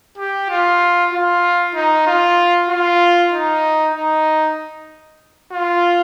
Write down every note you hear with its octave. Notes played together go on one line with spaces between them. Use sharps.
G4
F4
F4
D#4
F4
F4
D#4
D#4
F4